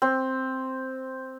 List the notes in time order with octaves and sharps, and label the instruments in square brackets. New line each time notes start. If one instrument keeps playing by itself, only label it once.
[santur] C4